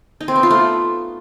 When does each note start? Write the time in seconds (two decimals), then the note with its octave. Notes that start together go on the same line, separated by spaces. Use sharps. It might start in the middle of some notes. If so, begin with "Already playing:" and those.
0.21 D#4
0.28 C4
0.36 B3
0.43 F4
0.51 A3